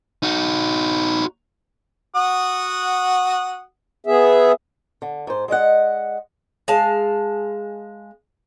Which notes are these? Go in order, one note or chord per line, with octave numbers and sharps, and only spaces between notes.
D#4 F#4
F#4 F#5 D#6
B3 G#4 E5
D3
G#2 C5
G#3 D5 D#5 F#5
G#3 F5 A5